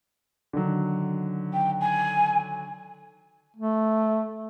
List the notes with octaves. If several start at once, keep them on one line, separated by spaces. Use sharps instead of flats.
D3 D#3 F#3
G5
G#5
A3